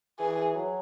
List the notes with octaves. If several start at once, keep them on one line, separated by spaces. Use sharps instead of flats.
E3 G#4
F#3